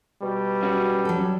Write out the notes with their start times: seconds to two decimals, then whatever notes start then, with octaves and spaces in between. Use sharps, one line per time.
0.22 B2 G3
0.63 C#4 F#4
1.05 F#3 A4